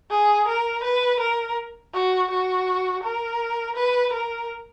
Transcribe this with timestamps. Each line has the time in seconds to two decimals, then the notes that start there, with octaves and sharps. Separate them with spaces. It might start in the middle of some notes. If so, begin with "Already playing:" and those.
0.10 G#4
0.47 A#4
0.83 B4
1.20 A#4
1.93 F#4
2.31 F#4
3.04 A#4
3.76 B4
4.13 A#4